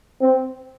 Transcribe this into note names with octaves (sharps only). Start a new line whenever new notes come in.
C4